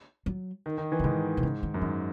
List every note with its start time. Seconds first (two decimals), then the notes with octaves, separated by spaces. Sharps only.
0.26 F#3
0.66 D#3
0.78 D#3
0.92 E3
0.99 C#3
1.04 G#2 D#3
1.37 B2
1.43 C#3
1.63 D#3
1.74 F#2
1.81 G#2 D#3